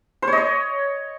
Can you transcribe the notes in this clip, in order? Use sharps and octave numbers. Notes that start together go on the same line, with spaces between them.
C5
C#5
D#5
C#5